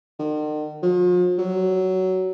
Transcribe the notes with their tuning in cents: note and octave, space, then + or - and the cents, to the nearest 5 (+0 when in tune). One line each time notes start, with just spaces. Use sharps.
D#3 -45
F3 +40
F#3 +15